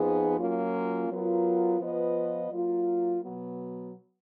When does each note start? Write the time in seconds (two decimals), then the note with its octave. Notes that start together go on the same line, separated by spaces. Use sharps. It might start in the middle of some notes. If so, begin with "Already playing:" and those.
Already playing: F2 F3 B3 D#4 G#4
0.37 F#3 A#3 C#4 F4
1.09 F#3 B3 F4 A#4
1.79 F3 B3 F4 B4 D#5
2.51 F#3 A#3 F4
3.22 B2 F#3 B3